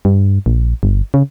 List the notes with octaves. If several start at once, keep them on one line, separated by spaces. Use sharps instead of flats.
G2
A#1
G1
C#3